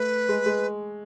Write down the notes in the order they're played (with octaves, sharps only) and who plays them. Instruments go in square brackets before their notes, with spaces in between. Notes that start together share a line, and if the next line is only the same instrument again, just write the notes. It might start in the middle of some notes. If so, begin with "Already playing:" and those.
Already playing: [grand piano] A3 [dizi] B4
[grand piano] G#3
G#3